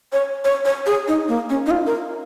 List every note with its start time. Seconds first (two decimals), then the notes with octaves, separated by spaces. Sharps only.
0.13 C#5
0.45 C#5
0.65 C#5
0.86 G#4
1.08 D#4
1.28 A#3
1.50 C#4
1.66 D#4
1.71 F4
1.86 A#4